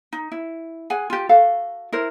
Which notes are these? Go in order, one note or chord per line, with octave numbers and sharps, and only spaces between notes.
D#4
E4
G#4 F#5 G#5
F4 G4
F#4 A4 F5
E4 A#4 C5